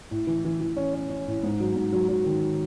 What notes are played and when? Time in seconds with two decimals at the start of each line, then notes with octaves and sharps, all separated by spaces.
0.11 A2
0.27 E3
0.45 E3
0.61 E3
0.76 C#4
0.94 C#4
1.10 C#4
1.27 A2
1.43 G#2
1.60 F#3
1.76 G#2
1.93 F#3
2.08 F#3
2.25 D#3